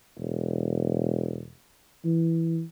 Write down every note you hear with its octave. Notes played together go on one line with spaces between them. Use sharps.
E1
E3